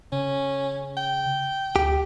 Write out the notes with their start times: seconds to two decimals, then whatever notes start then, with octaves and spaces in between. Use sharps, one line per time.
0.12 C#3 C#4
0.97 G5
1.76 D2 G4